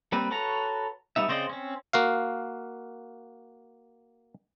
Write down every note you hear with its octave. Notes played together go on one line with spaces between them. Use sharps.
G3 A#3 C4 B4
F#4 A4 B4 C#5 A#5
G3 B3 D#4 E5
C#3 C4 C5 D5 D#5
C4 C#4
A#3 F#4 F5